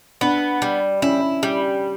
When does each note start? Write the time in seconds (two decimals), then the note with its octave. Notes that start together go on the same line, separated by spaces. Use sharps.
0.21 B3 D4
0.62 G3
1.02 C#4 E4
1.43 G3